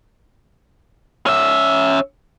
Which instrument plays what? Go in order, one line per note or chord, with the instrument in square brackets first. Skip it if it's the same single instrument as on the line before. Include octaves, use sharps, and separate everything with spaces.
[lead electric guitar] C#4 E5